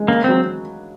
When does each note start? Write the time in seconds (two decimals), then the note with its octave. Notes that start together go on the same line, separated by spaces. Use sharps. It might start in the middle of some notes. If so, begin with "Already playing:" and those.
Already playing: G#3
0.08 C#3 A#3
0.24 F#3 C4